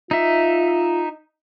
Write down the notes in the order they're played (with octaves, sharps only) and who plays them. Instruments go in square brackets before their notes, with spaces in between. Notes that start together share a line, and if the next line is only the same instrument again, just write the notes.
[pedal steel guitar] D#4 E5 [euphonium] F4